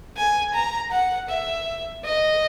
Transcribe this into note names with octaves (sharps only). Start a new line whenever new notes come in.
G#5
A#5
F#5
E5
D#5